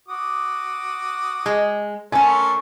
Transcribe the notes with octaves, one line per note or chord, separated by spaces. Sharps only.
F#4 D6 D#6
G#3
A3 C#4 A4 A#4 C5 G#5